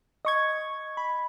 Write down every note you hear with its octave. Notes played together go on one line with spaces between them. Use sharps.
D#5 C#6 G#6
B5